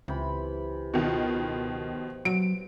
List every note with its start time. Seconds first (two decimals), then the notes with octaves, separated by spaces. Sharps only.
0.08 C#2 C3 E3 B5
0.94 B2 D#3 F3 B3
2.25 F#3 D7